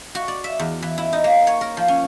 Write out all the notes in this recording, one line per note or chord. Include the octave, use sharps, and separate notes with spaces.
F#4
D5
E5
E2
E3
E4
D#4
A#3
C#5
A#4
F3
C#4